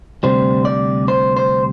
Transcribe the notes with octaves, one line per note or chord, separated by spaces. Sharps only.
D2 C3 G3 C5
D5
C5
C5